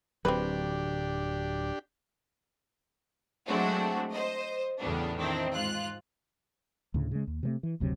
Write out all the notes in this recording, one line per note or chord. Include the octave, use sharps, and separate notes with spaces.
D1 F#3 C4 D4 G4 B4
F#3 G#3 A3 C4 D4 F#4
C5 D#5
E2 A2 C#3 G3 B3 D4
D#3 C4 D4 E4
G#2 F4 F#6
D2 A2 C#3
C#3 G#3
D#2
C3 F#3 A3
E3
F#1 D2 C3 F#3